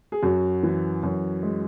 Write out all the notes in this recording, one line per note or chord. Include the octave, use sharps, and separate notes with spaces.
G#4
F#2 F#4
E3
F#2
G#3